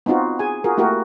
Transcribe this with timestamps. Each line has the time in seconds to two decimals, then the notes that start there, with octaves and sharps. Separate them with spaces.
0.06 B3 C4 D#4 F4 F#4
0.39 G#4 G#5
0.64 F4 F#4 G#4 A#4
0.77 A3 A#3 E4 F#4 G4 A#4